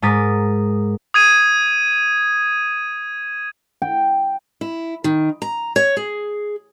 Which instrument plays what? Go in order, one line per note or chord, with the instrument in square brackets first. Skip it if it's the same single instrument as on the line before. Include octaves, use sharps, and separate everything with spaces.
[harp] G#2 A#4 D#6 A6 B6
[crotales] D#6 G#6 D#7
[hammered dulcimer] G5
[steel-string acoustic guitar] E4
D#3
A#5
C#5
G#4